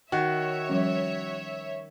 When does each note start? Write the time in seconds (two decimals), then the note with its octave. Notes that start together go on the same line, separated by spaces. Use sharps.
0.12 D#3 F#4 C#5 E5
0.69 F3 G3 C#4